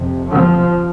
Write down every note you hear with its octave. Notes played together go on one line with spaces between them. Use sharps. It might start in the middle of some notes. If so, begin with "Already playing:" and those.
Already playing: F2 C3
F3